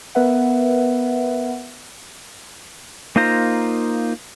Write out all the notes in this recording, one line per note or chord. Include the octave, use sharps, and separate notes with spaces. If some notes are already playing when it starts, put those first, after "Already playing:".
B3 A#4 B4 E5 F#5
A#3 D#4 F4 C5 A#5